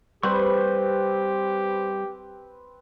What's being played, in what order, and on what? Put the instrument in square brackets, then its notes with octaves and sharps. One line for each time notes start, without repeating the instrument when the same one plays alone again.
[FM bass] G3 [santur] C4 B4 [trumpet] G4 [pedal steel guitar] C5 B5 C#6